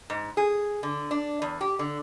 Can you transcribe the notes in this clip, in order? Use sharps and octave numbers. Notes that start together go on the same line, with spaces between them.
G#2
G#4
D3
D4
E2
G4
D3